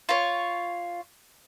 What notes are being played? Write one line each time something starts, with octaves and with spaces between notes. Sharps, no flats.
F4 C#5